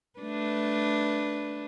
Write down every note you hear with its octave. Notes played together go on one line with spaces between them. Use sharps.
A3 D4 B4